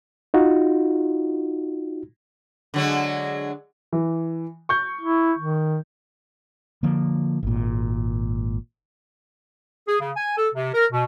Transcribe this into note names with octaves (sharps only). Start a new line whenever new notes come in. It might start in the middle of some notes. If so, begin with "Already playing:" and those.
D#4 F4 F#4
D3 F#3 G#3
E3
C#6 G6
E4
D#3
D3 F3 A#3
G#1 A#2
G#4
C#3
G#5
A4
C3
A#4
B2